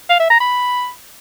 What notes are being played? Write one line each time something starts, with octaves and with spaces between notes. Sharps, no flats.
F5
E5
A#5
B5